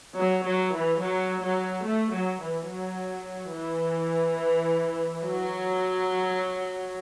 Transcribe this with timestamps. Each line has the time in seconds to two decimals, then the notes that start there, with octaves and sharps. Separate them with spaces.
0.17 F#3
0.45 F#3
0.74 E3
1.01 F#3
1.43 F#3
1.86 A3
2.13 F#3
2.42 E3
2.70 F#3
3.54 E3
5.22 F#3